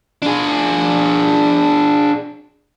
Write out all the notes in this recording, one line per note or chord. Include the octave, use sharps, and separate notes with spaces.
D4 G#4